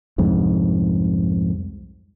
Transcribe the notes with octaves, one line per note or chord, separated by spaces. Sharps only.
C2 F2 G#2